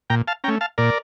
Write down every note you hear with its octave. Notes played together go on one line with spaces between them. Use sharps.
A#2 G5 A#5
F5 A5
A3 C#4 G5 A#5
F5 A5
A#2 A#4 D5